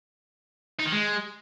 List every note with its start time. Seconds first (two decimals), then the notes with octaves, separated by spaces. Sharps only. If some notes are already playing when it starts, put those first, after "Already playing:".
0.80 D#4
0.86 D#3
0.92 G#3